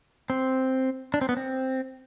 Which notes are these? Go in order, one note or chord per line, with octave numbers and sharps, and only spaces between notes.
C4
D4
C4
B3
C4